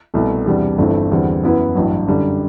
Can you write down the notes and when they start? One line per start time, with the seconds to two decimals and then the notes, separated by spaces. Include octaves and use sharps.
0.14 C2 B2 A3
0.46 E2 C3 G3 D4
0.78 G1 G2 E3 A3 C4
1.10 E2 D3 G3 C4 F#4
1.43 F#2 E3 B3 E4 B4
1.75 A1 G2 F#3
2.07 F#2 D3 G3